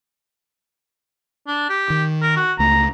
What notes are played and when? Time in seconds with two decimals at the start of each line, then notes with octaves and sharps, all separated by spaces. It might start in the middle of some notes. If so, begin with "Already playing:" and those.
1.47 D4
1.69 G4
1.90 D#3
2.22 A#4
2.36 F#4
2.59 C#2 A3 A#5